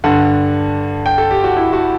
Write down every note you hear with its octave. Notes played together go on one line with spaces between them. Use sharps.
G2 D3 F#5
G5
A4
G4
F#4
E4
F#4